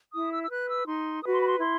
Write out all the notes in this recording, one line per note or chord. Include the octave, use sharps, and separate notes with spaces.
E4 D#6
E6
E6
B4 F#6
E6
D#4 C6
F#4 B4 C6 D#6
B5
C6
E4 C6